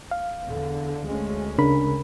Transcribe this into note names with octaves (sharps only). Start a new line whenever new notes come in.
F5
E2 D3
D2 G#3 C#4
C#3 D4 A#4 B5